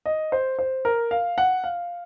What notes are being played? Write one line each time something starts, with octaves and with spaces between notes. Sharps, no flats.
D#5
C5
C5
A#4
F5
F#5
F5